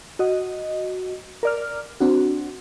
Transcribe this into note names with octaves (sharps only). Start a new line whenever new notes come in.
F#4 D#5
A#4 D5 F6
C4 D4 F#4